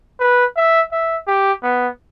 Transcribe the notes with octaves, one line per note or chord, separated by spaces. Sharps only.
B4
E5
E5
G4
B3